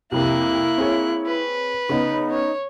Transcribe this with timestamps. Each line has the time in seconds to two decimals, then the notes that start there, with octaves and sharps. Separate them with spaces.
0.12 C2 F2 C3 A#3 E4 F#6
0.78 C4 G#4 C#5
1.26 B4
1.89 C#3 B3 D#4
2.30 C#5